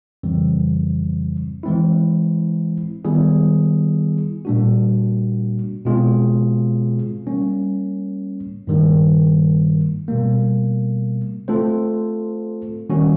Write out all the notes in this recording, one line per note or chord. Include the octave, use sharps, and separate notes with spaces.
F2 C#3 E3 G3 C4
E3 G#3 C4 E4
D#3 G3 B3 E4 G#4
A#2 G3 A#3 D4 F#4
B2 G#3 C4 F4 G#4
G3 A#3 C#4
G2 D#3 G3 A#3
B2 G3 A#3
A3 C4 F4 A4 C5
D#3 G3 A#3 C#4 F#4